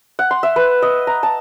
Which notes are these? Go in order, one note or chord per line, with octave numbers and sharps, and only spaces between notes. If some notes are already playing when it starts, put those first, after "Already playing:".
F#5
C6
E5
B4
D#5
A#5
A5